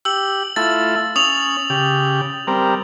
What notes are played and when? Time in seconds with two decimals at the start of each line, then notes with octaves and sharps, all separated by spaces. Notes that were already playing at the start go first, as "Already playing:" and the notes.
0.05 G4 E6 F#7
0.56 A3 E4 F4 A6
1.16 C#4 D#6 F7 F#7
1.70 C#3 G4
2.47 G3 C4 A#4